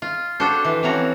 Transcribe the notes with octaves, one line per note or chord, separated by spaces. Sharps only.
F4
D4 F#4 G4 A4 C5
E3
E3 F3 C4 C#4 F#4 A#5